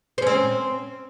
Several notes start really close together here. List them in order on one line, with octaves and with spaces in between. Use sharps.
C5 C#4 C4